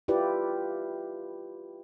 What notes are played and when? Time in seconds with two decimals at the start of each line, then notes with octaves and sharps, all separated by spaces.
0.08 E4 F4 G4 B4 D5